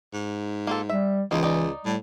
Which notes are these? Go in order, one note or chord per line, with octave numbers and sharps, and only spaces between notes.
G#2
A#3 F4 A4
G3 E5
C#2 E3 A#3 D#4
D#4 D5
A2 G3